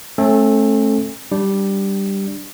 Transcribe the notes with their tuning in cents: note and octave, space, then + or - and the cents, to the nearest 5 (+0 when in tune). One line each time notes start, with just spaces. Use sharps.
A3 -20 C#4 -45 A4 +0
G3 +0 D4 +0